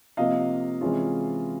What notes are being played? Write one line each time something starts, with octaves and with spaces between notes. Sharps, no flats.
C3 F3 A#3 D#5 F5
C3 E3 G#3 C#4 F4